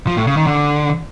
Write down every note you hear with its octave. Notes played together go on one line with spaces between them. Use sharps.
F3
A2
C#3
D#3
D3